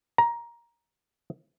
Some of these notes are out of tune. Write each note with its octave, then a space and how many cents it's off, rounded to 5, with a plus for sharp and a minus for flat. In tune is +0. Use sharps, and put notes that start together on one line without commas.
A#5 +15